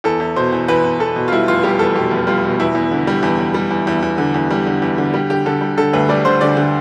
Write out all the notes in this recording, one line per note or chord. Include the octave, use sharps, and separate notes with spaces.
E2 A4
E2
B2 C5
E2
E2 B4
E2
E2 A4
B2
F4
G3 E4
F1 F4
G3 G4
E2 A4
B2 G4
F1
G3 F4
B2
E2 E4
E2
D3
G3
E2
E2
G3
E2
E2
E2
D3
E2
G3
D3
E2
D3
G3 G4
D3 G4
D3 A4
G3
D3 A4
D2 B4
G3 D5
D3 C5
D3 D5
D3